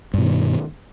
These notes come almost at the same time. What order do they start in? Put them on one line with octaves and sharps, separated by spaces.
G2 B2 D#3